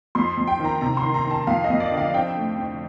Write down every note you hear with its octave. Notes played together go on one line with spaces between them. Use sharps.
F2 C6
F2
G5
D#3 A#5
C3 A#5
C6
D#3
A#5
D#3
A5
F2 F5
D#5
F2
D5
D3
F5
C4 G5
A3
C4